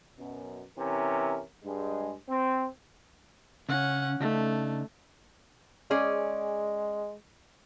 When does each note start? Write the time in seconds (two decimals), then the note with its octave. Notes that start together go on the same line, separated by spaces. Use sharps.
0.18 F#2 B2
0.77 C3 E3 C#4 E4 A#4
1.64 G2 G#3
2.28 C4
3.69 C#3 C#4 F#5
4.20 C#3 A3 D4 D#4
5.90 G#3 C#4 G#4 D5